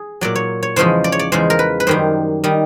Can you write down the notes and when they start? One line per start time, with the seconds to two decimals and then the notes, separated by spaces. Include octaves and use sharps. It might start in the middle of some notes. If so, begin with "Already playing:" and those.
Already playing: G#4
0.21 A#2 F#3 D5
0.35 C#5
0.63 C#5
0.76 E2 C#3 F3 G#3 C5
1.04 D5
1.12 C#5
1.19 D5
1.32 E2 C#3 F3 G#3 C5
1.50 A#4
1.59 B4
1.80 B4
1.87 F#2 D#3 G3 C5
2.44 D#3 G3